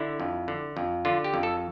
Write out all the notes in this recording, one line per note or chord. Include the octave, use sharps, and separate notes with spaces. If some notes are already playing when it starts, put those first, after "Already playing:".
Already playing: D3 E4
F2
D3
F2
D3 F4
G4
F2
A4